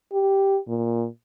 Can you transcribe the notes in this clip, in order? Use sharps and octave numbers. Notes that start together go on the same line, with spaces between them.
G4
A#2